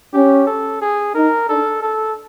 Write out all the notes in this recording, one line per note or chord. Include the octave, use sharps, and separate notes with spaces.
C#4 G4
A4
G#4
D#4 A#4
D4 A4
A4